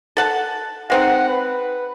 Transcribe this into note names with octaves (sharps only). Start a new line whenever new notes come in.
A4 F#5 A5
G#3 C4 D#4 F#5
B4